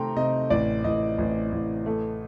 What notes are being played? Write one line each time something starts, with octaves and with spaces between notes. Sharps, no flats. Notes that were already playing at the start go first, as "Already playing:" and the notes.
Already playing: C3 D#3 A3 G5 A#5 C6
C3 D#5
A1 D5
A1 D#5
A1
A1
A3